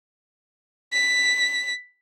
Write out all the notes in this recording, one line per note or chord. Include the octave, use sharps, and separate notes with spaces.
B6